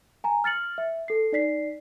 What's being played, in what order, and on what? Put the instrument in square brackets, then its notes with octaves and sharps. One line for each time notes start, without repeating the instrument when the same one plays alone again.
[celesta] G#5 A#5
F6 A6 C#7 F#7
E5
A4 C7
D#4 D5 B6 C7